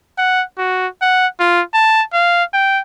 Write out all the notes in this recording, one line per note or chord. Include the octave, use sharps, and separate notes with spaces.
F#5
F#4
F#5
F4
A5
F5
G5